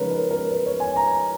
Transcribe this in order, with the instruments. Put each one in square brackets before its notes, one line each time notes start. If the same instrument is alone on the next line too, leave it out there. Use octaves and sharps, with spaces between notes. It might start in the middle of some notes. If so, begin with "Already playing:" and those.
Already playing: [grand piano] C#3 F3 G#3 D#4 A#4 B4 C#5
A#4
A#4
B4
C#5
G#5
A#5